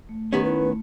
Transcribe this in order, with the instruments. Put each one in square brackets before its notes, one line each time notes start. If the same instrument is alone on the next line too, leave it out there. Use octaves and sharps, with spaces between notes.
[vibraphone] A3
[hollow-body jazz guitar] D#3 B3 C#4 [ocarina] G4
[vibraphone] E4 B5 [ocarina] B4
[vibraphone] A3